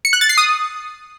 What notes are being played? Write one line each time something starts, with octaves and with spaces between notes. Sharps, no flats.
C#7
F#6
A6
C7
D#6